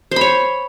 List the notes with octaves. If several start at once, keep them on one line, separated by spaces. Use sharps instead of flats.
C5 C#5 B5